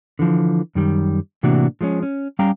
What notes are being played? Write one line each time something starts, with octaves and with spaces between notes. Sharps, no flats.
D3 E3 F3
F#2 D#3 G3
A2 C3 E3 A#3 D4 F#4
F3 G#3 A3 C#4
C#4
G3 C#4 F5 G5 A#5